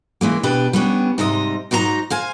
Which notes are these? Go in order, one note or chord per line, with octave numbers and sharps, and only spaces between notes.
C#3 E3 G#3 A#3
B2 D4 G4 B4
G3 B3 C#4 D4
G#2 C3 G3 D#5
G#2 F#3 D#4 A4 A#5
C5 F5 G#5